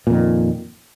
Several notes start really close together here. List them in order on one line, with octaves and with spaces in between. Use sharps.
A#2 F2 D#3